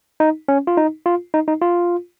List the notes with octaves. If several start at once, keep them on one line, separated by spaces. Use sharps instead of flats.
D#4
C#4
F4
D#4
F4
D#4
D#4
F4